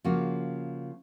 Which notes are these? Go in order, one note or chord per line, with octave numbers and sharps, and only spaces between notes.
C#3 F3 A#3 C#4 F#4